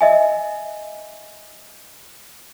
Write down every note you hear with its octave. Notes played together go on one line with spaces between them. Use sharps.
D#5 E5 G#5